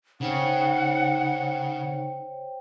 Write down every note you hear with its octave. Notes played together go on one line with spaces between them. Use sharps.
C#3 D#4 C5 C#5 F#5 G5